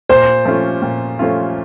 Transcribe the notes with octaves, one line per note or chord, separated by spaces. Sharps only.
A#2 C5
F3 A3 C#4 F4
A#2
F3 A3 C#4 F4